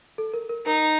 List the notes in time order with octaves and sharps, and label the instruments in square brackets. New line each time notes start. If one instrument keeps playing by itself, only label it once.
[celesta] A4
A#4
A#4
[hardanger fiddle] D#4 [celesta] A#4